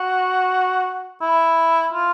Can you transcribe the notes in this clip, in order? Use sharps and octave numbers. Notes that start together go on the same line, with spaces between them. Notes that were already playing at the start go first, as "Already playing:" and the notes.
Already playing: F#4
E4
F4